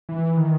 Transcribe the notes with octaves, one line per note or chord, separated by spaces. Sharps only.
E3
D#3